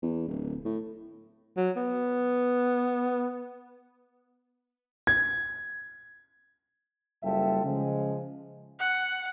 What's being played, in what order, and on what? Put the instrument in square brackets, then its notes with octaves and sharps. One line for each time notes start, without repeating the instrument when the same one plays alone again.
[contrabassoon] E2
D1
A2
[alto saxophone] F#3
B3
[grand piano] G#6
[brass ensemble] F#1 G3 F4 A4 E5 G5
C#3 F3 G#3
[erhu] F#5